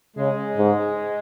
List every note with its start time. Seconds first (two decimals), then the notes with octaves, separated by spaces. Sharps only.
0.17 C#3 G#3
0.58 G#2